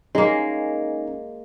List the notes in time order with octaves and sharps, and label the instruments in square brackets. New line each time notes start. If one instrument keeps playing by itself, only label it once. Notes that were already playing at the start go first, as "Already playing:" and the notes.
[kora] G#3 A#3 [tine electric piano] C#4 D#4